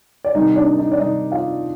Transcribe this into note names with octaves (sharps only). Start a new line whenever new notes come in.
D5
C3 D#3 G3 D#4 D#5
D4 D5
D#4 D#5
D5
C3 D#3 G3 D#4 D#5
F4 F5